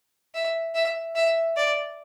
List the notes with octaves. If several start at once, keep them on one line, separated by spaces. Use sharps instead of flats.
E5
E5
E5
D5